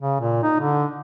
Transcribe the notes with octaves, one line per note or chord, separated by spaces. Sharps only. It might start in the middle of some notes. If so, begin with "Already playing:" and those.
C#3
A#2
D#4
D3